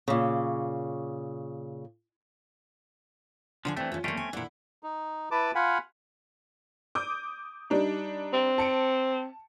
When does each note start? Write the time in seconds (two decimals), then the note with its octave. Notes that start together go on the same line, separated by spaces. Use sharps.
0.08 A#2 C#3
3.65 D3 F3 D4 F5 G#5
3.76 E3 G3 A3 C4 D4
3.92 C#4 F4
4.04 G3 A3 A#3 C4 C#4
4.17 G#5
4.33 A#2 D3 E3 E4
4.83 D#4
5.31 E4 B4 A5 D6
5.55 F4 F5 F#5 G#5 B5
6.95 D6 D#6 G6
7.70 G3 D4 D#4
8.33 C4
8.58 A5 C#7 D7